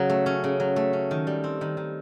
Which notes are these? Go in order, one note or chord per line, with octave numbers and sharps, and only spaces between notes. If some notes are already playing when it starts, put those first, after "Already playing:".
Already playing: C#3 F#3
A3
C#4
C#3
F#3
A3
C#4
D#3
G3
C4
D#3
D#3